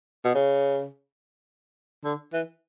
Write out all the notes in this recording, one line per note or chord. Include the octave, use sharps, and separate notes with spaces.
B2
C#3
D3
E3